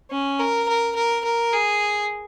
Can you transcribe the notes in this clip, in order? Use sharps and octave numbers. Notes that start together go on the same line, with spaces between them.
C#4
A#4
A#4
A#4
A#4
G#4